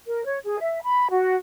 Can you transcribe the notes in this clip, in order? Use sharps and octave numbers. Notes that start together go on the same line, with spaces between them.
A#4
C#5
G#4
E5
B5
F#4